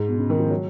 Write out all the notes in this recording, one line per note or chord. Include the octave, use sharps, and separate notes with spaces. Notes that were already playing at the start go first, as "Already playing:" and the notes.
Already playing: G#2 G#3
B2
C#3
D#3
F3
F#3